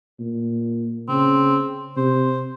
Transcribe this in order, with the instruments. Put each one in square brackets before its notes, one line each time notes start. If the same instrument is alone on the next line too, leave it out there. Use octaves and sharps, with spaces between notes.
[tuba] A#2
[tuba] C#3 [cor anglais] C4
[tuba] C3 [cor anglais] C5